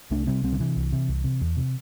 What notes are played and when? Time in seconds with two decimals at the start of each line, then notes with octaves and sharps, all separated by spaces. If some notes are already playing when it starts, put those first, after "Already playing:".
0.11 C2 A3 D4
0.27 C3 G3 C4
0.43 C2 G3 C4
0.52 D3
0.59 C3 E3
0.77 C2
0.92 C3
1.08 C2
1.24 C3
1.41 E2
1.57 C3